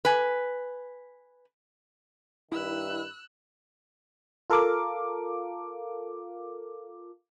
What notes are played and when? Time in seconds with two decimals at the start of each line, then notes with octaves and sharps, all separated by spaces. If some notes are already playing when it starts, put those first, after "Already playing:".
0.05 B4 G#5
2.52 G2 D#3 E4 E6 F#6
4.50 F4 A4 A#4 F5 D6